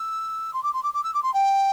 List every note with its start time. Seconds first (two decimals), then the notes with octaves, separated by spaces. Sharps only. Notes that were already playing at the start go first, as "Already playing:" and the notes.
Already playing: E6
0.54 C6
0.63 D6
0.73 C6
0.83 D6
0.94 D6
1.04 E6
1.14 D6
1.23 C6
1.34 G5